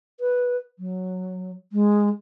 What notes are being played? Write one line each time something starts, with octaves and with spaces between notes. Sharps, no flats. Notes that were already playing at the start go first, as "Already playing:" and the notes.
B4
F#3
G#3